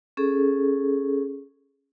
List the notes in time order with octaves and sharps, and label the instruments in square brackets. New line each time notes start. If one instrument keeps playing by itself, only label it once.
[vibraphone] C#4 G#4 A4